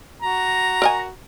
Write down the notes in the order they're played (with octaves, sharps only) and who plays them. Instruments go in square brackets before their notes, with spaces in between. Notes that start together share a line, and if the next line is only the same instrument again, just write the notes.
[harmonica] F#4 A#5
[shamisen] A#4 D#5 G#5